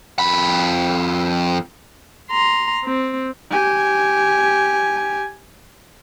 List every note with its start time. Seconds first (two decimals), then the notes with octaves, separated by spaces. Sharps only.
0.19 F2 B5
2.31 A#5 C6
2.84 C4
3.51 G4 G#5